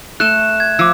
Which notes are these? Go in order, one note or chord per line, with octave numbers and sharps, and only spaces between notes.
A3 A4 F#6 E7
G#6
F3 D6 E6